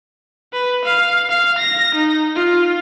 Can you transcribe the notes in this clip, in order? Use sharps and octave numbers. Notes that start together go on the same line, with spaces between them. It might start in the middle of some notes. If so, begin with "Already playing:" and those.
B4
F5
F5
A#6
D#4
F4